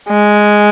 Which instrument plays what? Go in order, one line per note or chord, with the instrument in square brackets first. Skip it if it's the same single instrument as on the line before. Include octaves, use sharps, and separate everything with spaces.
[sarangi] G#3